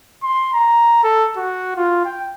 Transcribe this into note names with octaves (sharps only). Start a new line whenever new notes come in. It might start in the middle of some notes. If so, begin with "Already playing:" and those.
C6
A#5
A4
F#4
F4
G5